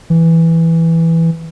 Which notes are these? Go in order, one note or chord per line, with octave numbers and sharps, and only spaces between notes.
E3